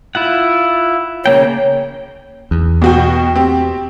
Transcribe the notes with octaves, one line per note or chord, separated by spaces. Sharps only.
E4 F4 F#5
C#3 A#3 C#5 G5
E2
B2 F#4 G5
C4 G4